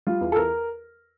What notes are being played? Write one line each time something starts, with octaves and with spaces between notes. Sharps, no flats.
G3 F4
E2
A4
E2 A#4